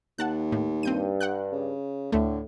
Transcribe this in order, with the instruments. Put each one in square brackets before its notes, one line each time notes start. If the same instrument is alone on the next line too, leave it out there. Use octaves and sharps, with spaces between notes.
[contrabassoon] D#2 [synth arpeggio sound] F#5 A5 F#6
[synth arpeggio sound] A2
[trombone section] G2 [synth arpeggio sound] C4 G6 D#7
[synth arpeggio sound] F#5 G5 F#6
[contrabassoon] C#3
[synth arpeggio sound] D2 A3 [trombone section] A2 [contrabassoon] D3